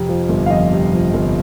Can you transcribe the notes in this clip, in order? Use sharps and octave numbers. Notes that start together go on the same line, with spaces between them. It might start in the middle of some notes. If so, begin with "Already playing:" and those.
Already playing: F2 C3
F3
G1
F5
F2 D#5
C3
F3
G1